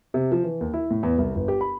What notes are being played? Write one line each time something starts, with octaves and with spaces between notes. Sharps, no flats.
C3
F3
E3
D#2
E4
A2
E2
C2
G1
G4
B5